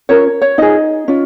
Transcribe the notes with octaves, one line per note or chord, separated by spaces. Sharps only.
C#4 F4 A#4 C#5
C#5
D#4 F4 G#4 D#5
C#4 F4